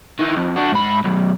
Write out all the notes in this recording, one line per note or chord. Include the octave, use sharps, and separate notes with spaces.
D#3 E3
F2
D4 F#4
G#2 B5
B1 F#2